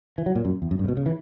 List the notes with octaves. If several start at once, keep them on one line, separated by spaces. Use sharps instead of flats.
E3
F#3
A#2
F#2
E2
F#2
G2
C#3
B2
C#3
E3